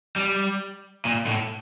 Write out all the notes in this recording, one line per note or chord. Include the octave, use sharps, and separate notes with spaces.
G3
A#2
A2